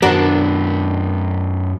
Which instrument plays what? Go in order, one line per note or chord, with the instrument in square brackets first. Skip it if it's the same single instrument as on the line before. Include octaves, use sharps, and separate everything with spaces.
[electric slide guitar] F#2 B3 [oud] D4 F#4 A#4